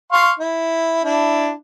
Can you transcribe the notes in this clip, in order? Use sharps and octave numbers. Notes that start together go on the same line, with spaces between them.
F5 C6 C#6
E4
D4 E4